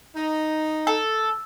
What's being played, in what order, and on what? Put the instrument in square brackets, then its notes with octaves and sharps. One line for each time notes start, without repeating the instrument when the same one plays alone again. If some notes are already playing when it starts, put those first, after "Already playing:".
[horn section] D#4
[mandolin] A4